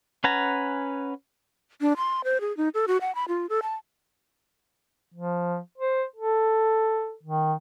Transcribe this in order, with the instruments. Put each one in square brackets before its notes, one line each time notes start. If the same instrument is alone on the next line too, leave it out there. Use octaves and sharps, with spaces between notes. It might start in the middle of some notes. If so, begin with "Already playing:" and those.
[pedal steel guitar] C#4 B4 F#5 G#5 A#5
[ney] D4
C6
C5
G#4
D#4
A4
F#4
F#5
B5
F4
A4
A5
[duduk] F3
C5
A4
D#3